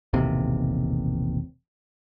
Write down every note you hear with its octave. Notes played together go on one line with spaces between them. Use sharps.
E1 A1 D#2 C3